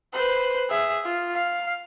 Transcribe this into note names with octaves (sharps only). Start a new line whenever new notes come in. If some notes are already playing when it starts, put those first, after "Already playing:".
B4 C5
G#4 E5
F4
F5